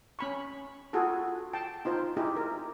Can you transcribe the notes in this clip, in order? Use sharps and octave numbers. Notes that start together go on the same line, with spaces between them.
C#4 B5 C#6
F4 F#4 G#4 A4
G5 A5
D#4 F4 C5
D#4 E4 G4 G#4
A#4